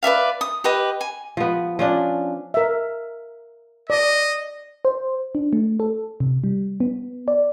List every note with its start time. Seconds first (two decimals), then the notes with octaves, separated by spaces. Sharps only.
0.03 B4 D5 E5 F5
0.41 D#6
0.64 G4 B4 D#5
1.01 G#5
1.37 F3 B3
1.79 F3 C#4 D4
2.54 A#4 E5
3.90 D5 D#5
4.85 C5
5.35 D4
5.53 A3
5.80 A4
6.20 C3
6.44 G3
6.80 B3
7.28 D5